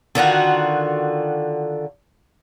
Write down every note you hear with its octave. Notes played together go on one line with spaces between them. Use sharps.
D3 D#3 F4 F#4